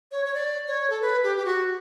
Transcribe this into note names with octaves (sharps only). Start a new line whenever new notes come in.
C#5
C#5
D5
C#5
A4
B4
G4
G4
F#4